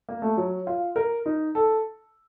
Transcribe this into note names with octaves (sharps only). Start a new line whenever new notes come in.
A#3
A3
F#3
F4
A#4
D#4
A4